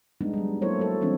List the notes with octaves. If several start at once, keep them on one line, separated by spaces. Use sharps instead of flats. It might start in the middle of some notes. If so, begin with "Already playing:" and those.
G3 G#3 B3 D4 D#4
F#3 G3
F#3 A#3 E4 A4 C5 C#5
F#3 A4
E3 F3 G3 A3 C4 D4